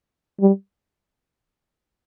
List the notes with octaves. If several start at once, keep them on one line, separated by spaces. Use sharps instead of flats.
G3